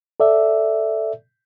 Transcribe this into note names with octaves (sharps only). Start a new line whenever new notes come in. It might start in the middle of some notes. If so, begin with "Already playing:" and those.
A4 D5 E5